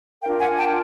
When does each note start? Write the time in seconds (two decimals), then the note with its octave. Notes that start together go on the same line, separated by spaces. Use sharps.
0.22 D4 F4 A#4 F5 G5
0.40 F#5 G#5
0.58 G5 A5